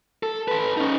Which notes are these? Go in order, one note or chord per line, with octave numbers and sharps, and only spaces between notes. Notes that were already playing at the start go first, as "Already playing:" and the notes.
A4
A4 B4
C#4 D#4